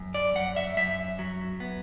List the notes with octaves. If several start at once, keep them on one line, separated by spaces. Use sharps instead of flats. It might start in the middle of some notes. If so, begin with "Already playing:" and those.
Already playing: F#2
D5
F#2 F#5
E5
F#2 E5
F#3
B3